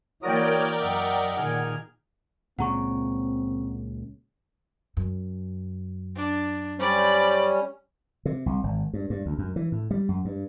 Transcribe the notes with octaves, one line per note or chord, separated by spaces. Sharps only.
E3 A#3 F#4 A#4 C#5 D5 G5 D#6
F#2 D#5 E5 F#5
A#2 D#3 G#4 G#5 F6
C#2 A#2 C#3 C4 F#5 A#5 C#6
F#2
D4
G3 C#4 C5 D5 B5
C3
C2
G#1
G2
G2
D2
F#2
E3
A2
G3
F#2
G2